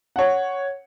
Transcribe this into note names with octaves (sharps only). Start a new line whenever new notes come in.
C#5 F#5